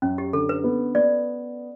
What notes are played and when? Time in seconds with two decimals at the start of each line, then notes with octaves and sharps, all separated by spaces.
0.02 F#2 C#4
0.18 G4
0.33 D3 A4
0.49 B4
0.64 B3
0.95 B3 D5